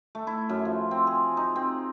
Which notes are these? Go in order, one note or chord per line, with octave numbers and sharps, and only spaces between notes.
A3
E4
F#2
F3
C4
G#4
D#4
C4